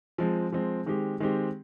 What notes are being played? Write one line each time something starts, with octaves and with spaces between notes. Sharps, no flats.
F3 G#3 C4
F3 G#3 C4
D#3 G#3 C4 G4
D#3 G#3 C4 G4